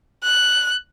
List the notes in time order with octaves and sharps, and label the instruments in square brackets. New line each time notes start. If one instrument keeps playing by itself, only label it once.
[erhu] F#6